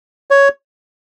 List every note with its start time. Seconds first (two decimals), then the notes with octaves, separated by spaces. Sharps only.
0.31 C#5